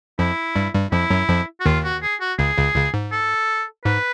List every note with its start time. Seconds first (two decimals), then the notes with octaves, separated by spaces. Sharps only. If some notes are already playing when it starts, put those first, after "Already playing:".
0.19 F2 F3 E4
0.56 G2 G3
0.74 G2 G3
0.92 F2 F3 E4
1.10 F#2 F#3
1.29 F2 F3
1.60 F#4
1.66 D#2 D#3 F4
1.84 F#4
2.02 G#4
2.21 F#4
2.39 C#2 C#3 G#4
2.57 C#2 C#3
2.75 C#2 C#3
2.94 G#2
3.12 A4
3.85 G#2 B4